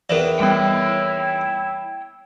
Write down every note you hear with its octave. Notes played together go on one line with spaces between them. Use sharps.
E2 D#3 E3 A#4 D5
G3 B3 E4 C#5 G5